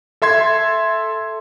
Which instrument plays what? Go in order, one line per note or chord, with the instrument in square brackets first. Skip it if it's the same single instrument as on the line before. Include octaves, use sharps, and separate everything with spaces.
[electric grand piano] A4 E5 C6 G#6